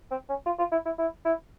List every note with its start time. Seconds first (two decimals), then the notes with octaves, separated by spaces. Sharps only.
0.11 C4
0.29 C#4
0.46 F4
0.59 F4
0.72 E4
0.85 E4
0.98 E4
1.25 E4